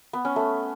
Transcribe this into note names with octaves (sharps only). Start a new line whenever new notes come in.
B3
C#4
A3